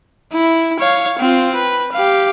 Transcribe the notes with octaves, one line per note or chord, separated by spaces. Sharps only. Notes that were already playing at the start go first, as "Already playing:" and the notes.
E4
C#5 F5
C4 F4
B4
G4 F5